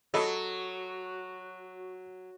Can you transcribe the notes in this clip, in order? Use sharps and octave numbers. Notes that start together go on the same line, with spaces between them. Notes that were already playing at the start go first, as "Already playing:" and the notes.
F#3 F#4 A4 D#5 B5